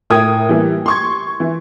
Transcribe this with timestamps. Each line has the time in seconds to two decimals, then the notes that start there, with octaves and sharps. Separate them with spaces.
0.10 A2 E4 A#4 G5 D#6 G#6
0.49 E3 G3 A#3 G4
0.86 C6 C#6 G#6
1.40 E3